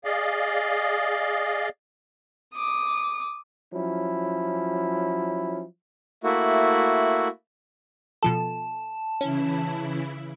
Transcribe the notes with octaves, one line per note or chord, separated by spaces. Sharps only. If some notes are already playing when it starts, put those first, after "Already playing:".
G#4 D5 D#5 F5
D6 D#6
F3 F#3 C#4 E4
A3 A#3 E4 F#4
B2 F3 A4 A5
C#3 E3 C#4 E4